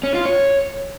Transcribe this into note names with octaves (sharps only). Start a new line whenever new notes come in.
C#4
F4
C#5